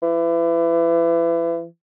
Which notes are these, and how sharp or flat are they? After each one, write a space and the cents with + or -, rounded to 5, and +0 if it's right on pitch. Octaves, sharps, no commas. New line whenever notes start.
E3 +30